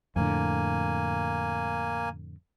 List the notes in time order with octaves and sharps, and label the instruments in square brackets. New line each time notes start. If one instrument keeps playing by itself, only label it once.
[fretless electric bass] F2 A2 D3 [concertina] A#3 G#5